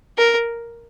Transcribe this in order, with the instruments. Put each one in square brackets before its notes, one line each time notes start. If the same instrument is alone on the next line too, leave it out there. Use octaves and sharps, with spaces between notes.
[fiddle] A#4